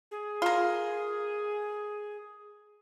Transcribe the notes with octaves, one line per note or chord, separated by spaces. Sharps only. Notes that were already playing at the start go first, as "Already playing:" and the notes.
G#4
F4 A#4